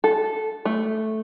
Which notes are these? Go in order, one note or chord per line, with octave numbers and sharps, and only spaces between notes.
A4
A3